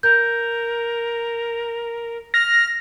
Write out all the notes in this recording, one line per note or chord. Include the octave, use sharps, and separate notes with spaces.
A#4 G6
F6 A#6